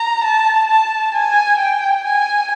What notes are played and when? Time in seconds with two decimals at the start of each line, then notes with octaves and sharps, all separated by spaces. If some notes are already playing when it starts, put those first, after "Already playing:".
Already playing: A#5
0.24 A5
0.69 A5
1.14 G#5
1.59 G5
2.04 G#5